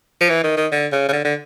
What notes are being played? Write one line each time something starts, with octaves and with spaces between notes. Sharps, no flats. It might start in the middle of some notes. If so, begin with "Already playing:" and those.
F3
E3
D#3
D#3
D3
C#3
C#3
D3
D3